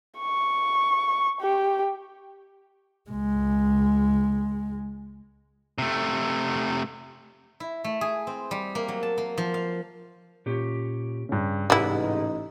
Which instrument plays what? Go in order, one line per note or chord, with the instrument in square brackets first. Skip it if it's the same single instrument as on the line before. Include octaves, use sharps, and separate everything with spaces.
[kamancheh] C#6
G4
[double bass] C#2 G#3
[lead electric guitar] C3 A3
[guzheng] E4
A3
G#4
C4
G3
A#3
F#3
A5
A#3
F3
F5
[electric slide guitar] A#2 C#4 G4
[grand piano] G2 C#3
[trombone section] A1 D#4 [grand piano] G#2 [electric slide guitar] C3 G#4 B4 [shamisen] G3 E4